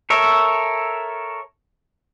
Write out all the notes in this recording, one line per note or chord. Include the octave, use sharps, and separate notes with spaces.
A4 A#4 C#5 E5